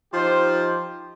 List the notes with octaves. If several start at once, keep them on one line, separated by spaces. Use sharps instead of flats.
F3 D#4 F4 G4 C5